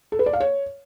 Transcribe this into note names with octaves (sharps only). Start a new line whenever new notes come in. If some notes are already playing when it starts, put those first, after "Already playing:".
A4
B4
D5
F5
C#5